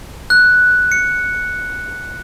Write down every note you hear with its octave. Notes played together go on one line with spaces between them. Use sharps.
F#6
C#7